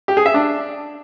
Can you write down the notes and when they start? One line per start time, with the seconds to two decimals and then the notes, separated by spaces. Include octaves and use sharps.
0.08 G4
0.17 G#4
0.26 E5
0.34 D4